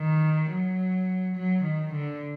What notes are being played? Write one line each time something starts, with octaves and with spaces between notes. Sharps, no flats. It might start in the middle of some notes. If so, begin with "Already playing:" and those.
Already playing: D#3
F#3
F#3
D#3
D3